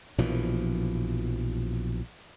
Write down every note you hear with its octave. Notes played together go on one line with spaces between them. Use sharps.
A#1 B2 E3 F3